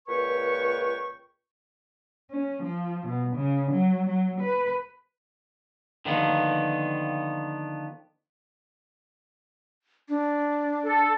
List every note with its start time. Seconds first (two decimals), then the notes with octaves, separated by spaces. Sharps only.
0.08 C#2 A#2 B4 C#5 G5 C#6
2.31 C#4
2.63 F3
3.06 B2
3.36 C#3
3.72 F#3
4.07 F#3
4.41 B4
6.05 D3 D#3 F3 A#3 B3
10.09 D4
10.84 A4